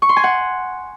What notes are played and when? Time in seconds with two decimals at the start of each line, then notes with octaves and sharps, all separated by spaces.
0.02 C#6
0.09 C6
0.16 G#5
0.24 F#5